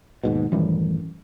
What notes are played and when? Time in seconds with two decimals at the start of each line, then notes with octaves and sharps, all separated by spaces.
0.24 D#2 G#2 B2
0.52 A1 F#2 D#3 E3 G3